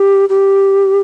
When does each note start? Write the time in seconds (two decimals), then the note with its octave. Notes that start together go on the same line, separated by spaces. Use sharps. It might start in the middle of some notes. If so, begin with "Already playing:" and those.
Already playing: G4
0.29 G4